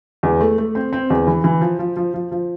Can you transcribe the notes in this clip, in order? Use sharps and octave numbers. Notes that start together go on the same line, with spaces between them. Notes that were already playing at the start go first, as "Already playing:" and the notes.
E2
A3
A3
C4
C4
E2
E3
E3
F3
F3
F3
F3
F3